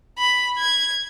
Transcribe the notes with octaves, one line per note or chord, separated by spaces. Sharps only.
B5
G#6